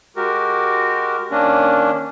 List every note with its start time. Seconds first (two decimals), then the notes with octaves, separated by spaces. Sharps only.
0.16 G#3 F#4 G4 A#4
1.31 D#3 A#3 C#4 D4